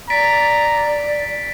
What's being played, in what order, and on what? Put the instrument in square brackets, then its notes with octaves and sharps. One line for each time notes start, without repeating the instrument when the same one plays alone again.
[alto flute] D5 [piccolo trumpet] A#5 [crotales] A6 B6 D7